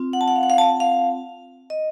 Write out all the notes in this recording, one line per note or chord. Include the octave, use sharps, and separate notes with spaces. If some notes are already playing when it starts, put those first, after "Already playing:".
Already playing: C4 F4
F#5
A5
F#5
F5
F#5
F5
A5
F5
D#5